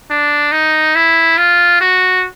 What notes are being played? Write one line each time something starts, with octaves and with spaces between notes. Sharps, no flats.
D4
D#4
E4
F4
F#4